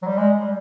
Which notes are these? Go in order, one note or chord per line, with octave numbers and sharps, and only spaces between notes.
F#3
G3
G#3
G3